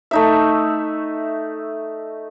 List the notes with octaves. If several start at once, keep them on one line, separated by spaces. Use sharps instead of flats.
A3 D#4 E5